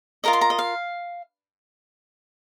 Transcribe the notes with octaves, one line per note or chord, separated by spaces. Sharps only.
F4 A#4 D#5 A#5
C6
A#5
D#5
F5